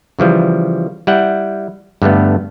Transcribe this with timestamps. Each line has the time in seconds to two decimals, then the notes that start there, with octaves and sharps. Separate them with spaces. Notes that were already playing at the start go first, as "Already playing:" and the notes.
0.19 C#3 E3 F3 G3
1.07 G3 E4 F#5 G5
2.02 G2 D3 A3 B3